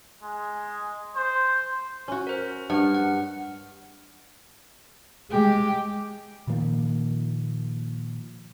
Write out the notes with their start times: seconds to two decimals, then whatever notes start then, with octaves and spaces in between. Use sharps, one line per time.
0.23 G#3
1.15 C5
2.08 C#4 F#4
2.27 A#4 C5
2.70 G2 F#5 F6
2.95 F#5
5.31 G#3 G4
6.47 A#2 D#3 F3 A#3